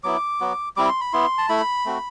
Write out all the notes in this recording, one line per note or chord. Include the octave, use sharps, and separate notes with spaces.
F#3 B3 E4 D6
F#3 B3 F#4
G3 C4 E4 D6
C6
B5
B3 E4 C6
A5
A3 E4 B5
A3 C4 F#4